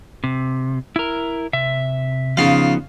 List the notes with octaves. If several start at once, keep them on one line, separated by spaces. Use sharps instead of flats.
C3
E4 A#4
C3 E5
C#3 F3 B3 D#4 F4 F5